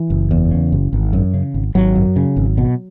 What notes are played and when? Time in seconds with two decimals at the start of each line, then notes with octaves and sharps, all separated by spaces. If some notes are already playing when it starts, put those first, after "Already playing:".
Already playing: E3
0.10 F#1
0.31 E2
0.51 C#3
0.72 F#1
0.93 G#1
1.13 F#2
1.34 C#3
1.54 G#1
1.75 G#1 F#3
1.95 F#2
2.16 C#3
2.37 G#1
2.58 B2